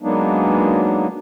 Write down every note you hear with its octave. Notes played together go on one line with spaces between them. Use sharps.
F#3 G#3 A#3 B3 D4 D#4